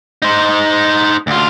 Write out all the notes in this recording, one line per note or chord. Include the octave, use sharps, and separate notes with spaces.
D#4 C5
D2 F4